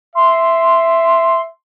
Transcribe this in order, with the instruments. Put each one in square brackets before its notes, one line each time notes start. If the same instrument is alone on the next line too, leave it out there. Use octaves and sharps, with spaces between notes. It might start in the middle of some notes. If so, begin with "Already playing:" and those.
[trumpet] E5 [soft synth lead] C6